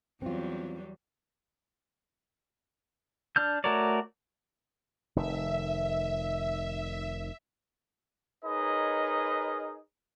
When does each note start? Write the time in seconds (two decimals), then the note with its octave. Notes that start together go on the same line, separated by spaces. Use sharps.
0.22 E2 F#3 G3 C4 F4
3.36 D4 F6 G6
3.64 A3 F#4 A#4 C#5 D5
5.16 F1 D#3 E5
8.45 D#4 G#4 A#4 B4 C#5 D#5